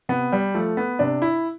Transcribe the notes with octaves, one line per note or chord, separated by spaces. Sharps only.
C3 B3
G3
F3 A3
B3
C3 D4
E4